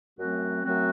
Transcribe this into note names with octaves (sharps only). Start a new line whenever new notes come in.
F#2 F#3 A3 C4 F#4
F#2 F#3 A3 C4 F#4